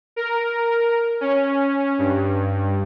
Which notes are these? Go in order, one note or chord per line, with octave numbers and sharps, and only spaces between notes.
A#4
C#4
G2